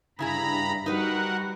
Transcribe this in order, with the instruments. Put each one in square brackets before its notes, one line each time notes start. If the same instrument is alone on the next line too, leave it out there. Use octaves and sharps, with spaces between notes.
[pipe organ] G2 A#5 B5 [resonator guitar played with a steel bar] C#3 E4 G#4
[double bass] G3 [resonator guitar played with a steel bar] D#4 B4 [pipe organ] F#4 A#4 F#5